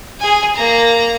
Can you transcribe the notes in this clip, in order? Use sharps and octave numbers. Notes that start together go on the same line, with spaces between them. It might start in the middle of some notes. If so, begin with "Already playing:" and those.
G#4 G#5
A#3 A#5